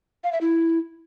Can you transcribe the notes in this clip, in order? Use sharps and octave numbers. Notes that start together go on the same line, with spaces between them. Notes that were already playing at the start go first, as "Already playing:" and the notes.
F5
E5
E4